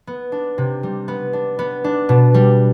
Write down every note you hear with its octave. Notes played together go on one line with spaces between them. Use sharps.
B3
D4
C3
G3
B3
D4
B3
D4
B2
G3